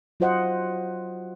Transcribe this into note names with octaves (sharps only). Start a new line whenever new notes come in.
F#3 F4 F#4 C5 D#5 F#5